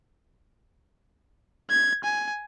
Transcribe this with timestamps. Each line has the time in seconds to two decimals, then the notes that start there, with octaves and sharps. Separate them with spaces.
1.70 G#6
2.04 G#5